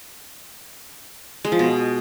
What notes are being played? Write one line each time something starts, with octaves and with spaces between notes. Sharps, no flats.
G#3
F3
B2